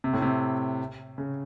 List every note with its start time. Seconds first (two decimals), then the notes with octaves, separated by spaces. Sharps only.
0.04 C3
0.13 A2
0.22 C3
1.18 C#3